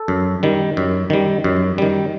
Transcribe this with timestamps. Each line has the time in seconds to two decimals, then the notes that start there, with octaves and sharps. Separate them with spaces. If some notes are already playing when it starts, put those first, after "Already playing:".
Already playing: A4
0.08 F#2
0.43 D#3 G3
0.77 F#2
1.10 D#3 G3
1.44 F#2
1.78 D#3 G3